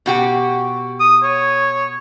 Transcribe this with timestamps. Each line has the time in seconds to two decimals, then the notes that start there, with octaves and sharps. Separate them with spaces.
0.06 B2 F#4 G4
1.00 D#6
1.23 C#5